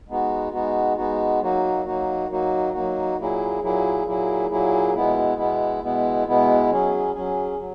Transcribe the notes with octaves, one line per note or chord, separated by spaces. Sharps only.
G#3 B3 D#4 F#4
G#3 B3 D#4 F#4
G#3 B3 D#4 F#4
F#3 A#3 D#4 F#4
F#3 A#3 D#4 F#4
F#3 A#3 D#4 F#4
F#3 A#3 D#4 F#4
A#2 F#3 A#3 E4 G#4
A#2 F#3 A#3 E4 G#4
A#2 F#3 A#3 E4 G#4
A#2 F#3 A#3 E4 G#4
B2 G#3 B3 E4
B2 G#3 B3 E4
B2 G#3 B3 E4
B2 G#3 B3 E4
F#3 C#4 G#4
F#3 C#4 G#4
F#3